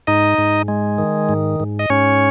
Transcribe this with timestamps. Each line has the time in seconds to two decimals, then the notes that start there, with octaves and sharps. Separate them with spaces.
0.07 G#2 D#4 D#5
0.38 G#2
0.68 G#3
0.98 D#3
1.29 G#2
1.60 G#2
1.79 D#5
1.90 G#2 C#4 C#5